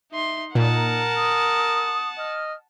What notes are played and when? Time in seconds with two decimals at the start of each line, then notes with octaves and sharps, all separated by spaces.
0.12 D#4 E5 C6
0.55 A#2 D#4 A#4 F#5 A5
1.16 D#6
2.18 D#5 F6